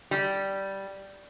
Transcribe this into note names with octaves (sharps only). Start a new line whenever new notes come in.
G3